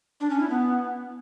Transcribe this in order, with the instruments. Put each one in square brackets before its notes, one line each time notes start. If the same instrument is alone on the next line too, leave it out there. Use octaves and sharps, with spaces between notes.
[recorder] D4
C#4
E4
B3